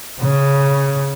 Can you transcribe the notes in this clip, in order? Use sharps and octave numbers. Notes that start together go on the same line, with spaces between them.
C#3